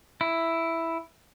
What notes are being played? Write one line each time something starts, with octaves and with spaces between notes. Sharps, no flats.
E4